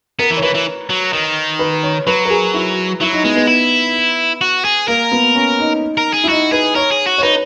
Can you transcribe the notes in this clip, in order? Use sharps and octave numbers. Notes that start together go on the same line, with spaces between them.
B3 A#4
E3
C#5
E3 B4
E3
F#3
D#3
B4
C#5
F#3 B4
A#4
G#4
E4
F#3 E4
D#4
G#3 B3
B3
E4
F#4
G#4
A#3 A#4
B3
C#4
D#4
A#4
G#4
E4
D#4 F#4
G#4 B4
A#4 C#5
G#4
F#4
C#5
D#4 B4